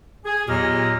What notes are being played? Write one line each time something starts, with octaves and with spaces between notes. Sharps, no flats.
G#4
E2 A#2 F#3 G4 D#5 F6